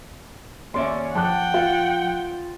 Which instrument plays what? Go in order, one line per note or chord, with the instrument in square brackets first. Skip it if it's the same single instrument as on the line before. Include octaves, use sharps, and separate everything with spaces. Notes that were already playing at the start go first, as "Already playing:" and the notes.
[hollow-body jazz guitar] D#2 D5 E5 [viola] C#4 [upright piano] C6
[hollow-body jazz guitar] F3 [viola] F#5 G5 [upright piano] A5 D6 F#6
[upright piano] F4